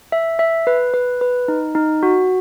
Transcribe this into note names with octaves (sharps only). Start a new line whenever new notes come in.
E5
E5
B4
B4
B4
D#4
D#4
F#4